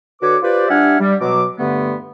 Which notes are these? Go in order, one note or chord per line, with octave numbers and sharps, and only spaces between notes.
D3 F#4 B4 C#5 D6
F4 G4 B4 C5 D5
G3 D4 E5 F#5 G#5 F6
G3
B2 F#3 D6
G2 D3 A3 B3